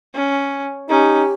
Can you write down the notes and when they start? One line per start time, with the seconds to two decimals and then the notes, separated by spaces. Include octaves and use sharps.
0.15 C#4
0.89 C#4 D#4 G4